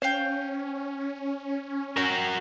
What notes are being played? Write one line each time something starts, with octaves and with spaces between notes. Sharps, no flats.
C#4 C5 F5 G5
F#4 A#4 C#5 G5